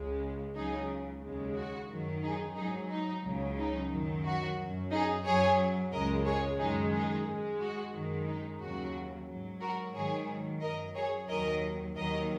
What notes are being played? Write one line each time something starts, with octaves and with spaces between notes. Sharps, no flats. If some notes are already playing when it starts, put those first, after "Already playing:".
Already playing: C#2 C#3 G#3
C#2 C#3 F#3 D#4 G#4
D#2 C#3 G#3
F#4
F#2 D#3 F#3
D#4 G#4
G#2 F#3 D#4 G#4
D#4
C#2 C#3 F#3
D#4
F#2 D#3 F#3
F#4
F#2 F#3
D#4 G#4
F#2 F#3 G#4 C#5
C#2 C#3 G#3 A#4 D#5
G#4 C#5
F#2 D#3 G#3 D#4 G#4
D#4 G#4
G#2 G#3
F#4
F#2 D#3 G#3
D#4
D#2 C#3 F#3 F#4
G#2 F#3
F#4 A#4
G#2 D#3 F#3 G#4 C#5
F#2 F#3 A#4 D#5
G#4 C#5
D#2 D#3 F#3 A#4 D#5
D#2 D#3 F#3 A#4 D#5